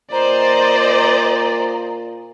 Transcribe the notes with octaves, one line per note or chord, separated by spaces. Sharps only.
A#2 C5 D5 D#5 A#5